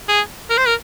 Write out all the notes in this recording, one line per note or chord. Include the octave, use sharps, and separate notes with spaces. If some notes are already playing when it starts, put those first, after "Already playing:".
G#4
A#4
C5
A#4